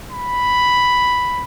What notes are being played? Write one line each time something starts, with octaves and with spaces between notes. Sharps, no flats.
B5